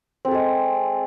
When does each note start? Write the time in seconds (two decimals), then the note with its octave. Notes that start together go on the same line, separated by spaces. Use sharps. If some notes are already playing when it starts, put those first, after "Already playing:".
0.25 C4
0.28 A4
0.31 G#4
0.34 G#3